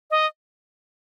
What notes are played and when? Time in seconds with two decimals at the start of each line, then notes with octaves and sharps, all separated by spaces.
0.11 D#5